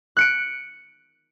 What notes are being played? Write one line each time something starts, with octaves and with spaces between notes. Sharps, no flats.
F#6 C#7 D7